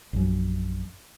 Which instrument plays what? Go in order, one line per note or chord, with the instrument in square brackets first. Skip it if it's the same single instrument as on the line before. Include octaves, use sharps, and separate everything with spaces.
[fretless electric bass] A#1 F#2